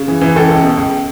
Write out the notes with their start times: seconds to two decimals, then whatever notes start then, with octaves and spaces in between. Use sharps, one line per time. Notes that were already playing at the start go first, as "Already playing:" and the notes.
Already playing: C#3
0.08 E3
0.21 E3
0.36 C#2 A4
0.49 C#2
0.63 B2
0.77 C#2